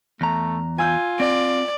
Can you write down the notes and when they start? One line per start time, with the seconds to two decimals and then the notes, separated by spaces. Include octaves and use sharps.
0.21 E2 A3 A#5
0.78 F4 G#5 E6 G6
1.20 C4 D5